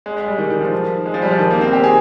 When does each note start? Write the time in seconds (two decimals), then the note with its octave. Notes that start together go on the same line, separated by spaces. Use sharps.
0.06 G#3
0.16 G#3
0.28 G3
0.38 D#3
0.50 D#3
0.61 F3
1.06 G#3
1.14 F3
1.22 G3
1.31 F3
1.39 D#3
1.51 A#3
1.61 C4
1.73 G4
1.84 G#4